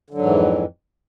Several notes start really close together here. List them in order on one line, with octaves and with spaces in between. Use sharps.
D3 F#3 G#2 E3 F2